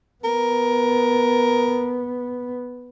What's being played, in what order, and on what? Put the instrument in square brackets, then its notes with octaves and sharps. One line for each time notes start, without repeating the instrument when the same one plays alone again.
[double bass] B3 [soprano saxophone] A#4